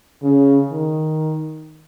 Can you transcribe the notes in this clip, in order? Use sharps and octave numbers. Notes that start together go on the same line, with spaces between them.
C#3
D#3